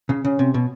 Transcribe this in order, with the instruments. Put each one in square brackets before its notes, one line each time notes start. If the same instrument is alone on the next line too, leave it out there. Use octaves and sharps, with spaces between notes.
[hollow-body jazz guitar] C#3
[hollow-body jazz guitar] C#3 [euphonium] C#4
[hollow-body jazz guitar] C3
B2